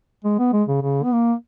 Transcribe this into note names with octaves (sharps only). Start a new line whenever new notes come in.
G#3
B3
G#3
C#3
C#3
B3
A#3